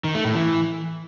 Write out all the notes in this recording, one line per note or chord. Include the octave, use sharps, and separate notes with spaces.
D#3
A3
A2
E3